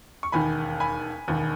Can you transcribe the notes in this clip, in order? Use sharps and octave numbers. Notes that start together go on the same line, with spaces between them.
C#6
E1 D#2 D#3 G#5 B5
G#5 B5
E1 D#2 D#3